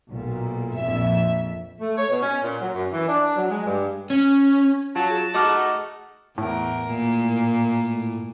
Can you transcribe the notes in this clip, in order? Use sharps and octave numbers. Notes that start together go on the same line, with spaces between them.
B1 A#2
A#1 F2 E5
A3
C#5
B2
C#4
A#2
F#3
F#2
E3
D4
F#3
G#3
G2
C#4
F#3 F4 A5
G#4
A3 D#4 F#4 D#5 D6 F6
E2 A2 A#4
A#2